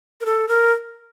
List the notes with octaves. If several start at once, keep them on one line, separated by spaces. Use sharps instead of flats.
A#4
A4
A#4